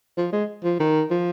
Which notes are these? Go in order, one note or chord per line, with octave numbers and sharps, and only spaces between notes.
F3
G#3
F3
D#3
F3